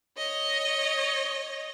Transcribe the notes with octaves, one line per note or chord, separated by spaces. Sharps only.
C#5 D#5